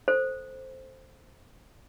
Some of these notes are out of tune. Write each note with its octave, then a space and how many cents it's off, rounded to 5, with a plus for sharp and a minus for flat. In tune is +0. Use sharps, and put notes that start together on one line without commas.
A4 +0 C5 +5